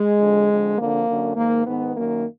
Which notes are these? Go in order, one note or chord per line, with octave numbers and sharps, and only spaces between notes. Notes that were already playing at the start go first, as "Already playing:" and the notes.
Already playing: G#3
F2 D3
F2 D3
F2 D3 A#3
F#2 D3
G#2 D#3 A#3
G#2 D#3 B3
F#2 D#3 A#3